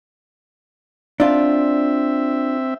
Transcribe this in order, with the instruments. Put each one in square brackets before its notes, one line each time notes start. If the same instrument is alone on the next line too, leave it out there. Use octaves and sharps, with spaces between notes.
[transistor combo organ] C4 E5 [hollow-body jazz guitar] D4 F4